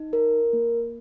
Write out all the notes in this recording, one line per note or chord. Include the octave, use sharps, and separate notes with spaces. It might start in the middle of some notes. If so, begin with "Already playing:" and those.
Already playing: D#4
A#4
A#3